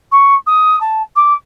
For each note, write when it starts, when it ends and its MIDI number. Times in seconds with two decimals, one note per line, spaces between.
0.12 0.34 85
0.46 0.79 87
0.80 1.02 81
1.16 1.33 86